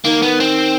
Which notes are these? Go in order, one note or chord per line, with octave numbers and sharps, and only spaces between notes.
D#3 A#3
B3
C4